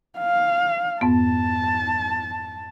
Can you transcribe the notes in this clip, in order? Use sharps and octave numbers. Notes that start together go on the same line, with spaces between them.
F5
F2 G#2 B3 A5